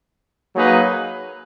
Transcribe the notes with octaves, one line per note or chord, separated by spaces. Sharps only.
F#3 A#3 D#4 G#4 B4